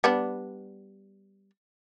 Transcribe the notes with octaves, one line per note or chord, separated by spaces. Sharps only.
G3 B3 D4